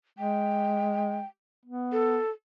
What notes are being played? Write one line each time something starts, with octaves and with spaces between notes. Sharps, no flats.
G#3 G5
B3
A4